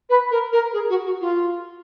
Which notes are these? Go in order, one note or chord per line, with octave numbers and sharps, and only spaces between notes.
B4
A#4
A#4
G#4
F#4
F#4
F4